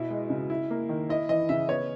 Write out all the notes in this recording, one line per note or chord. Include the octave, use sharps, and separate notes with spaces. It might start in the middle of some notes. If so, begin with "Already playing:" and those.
Already playing: B2 E4
G#3
C#3
E4
A#3
D#3
E4 D#5
E3 D#5
C#3 E5
B3 C#5